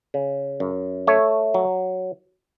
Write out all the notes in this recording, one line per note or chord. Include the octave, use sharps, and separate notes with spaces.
C#3
F#2
A3 C#5
F#3